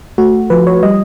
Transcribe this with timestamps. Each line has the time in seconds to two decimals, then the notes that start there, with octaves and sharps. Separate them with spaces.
0.18 A3 F#4
0.50 F3 B4
0.67 C#5
0.83 G3 D#5